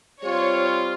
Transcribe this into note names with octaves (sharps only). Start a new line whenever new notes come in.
G3 C4 F4 C#5